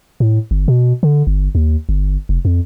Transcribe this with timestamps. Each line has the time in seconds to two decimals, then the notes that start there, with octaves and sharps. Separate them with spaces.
0.20 A2
0.51 G1
0.68 B2
1.03 D3
1.27 G1
1.55 D#2
1.89 G1
2.29 F1
2.45 F2